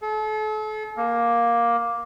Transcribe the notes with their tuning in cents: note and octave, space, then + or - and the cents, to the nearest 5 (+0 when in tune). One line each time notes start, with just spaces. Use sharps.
A4 -40
A#3 +10